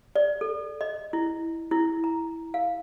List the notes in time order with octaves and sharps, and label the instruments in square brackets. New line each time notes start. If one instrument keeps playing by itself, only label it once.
[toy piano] D5
A4
D#5
E4
E4
A#5
F5